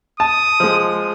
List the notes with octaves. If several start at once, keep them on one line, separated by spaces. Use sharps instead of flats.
A5 D#6
F3 G#3